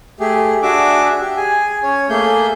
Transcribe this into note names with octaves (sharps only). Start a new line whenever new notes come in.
A3 G4 G#4
D4 F#4 G#4 E5 D6
G4
G#4 G#5
C#4 C#5
A3 A#3 G#4 G6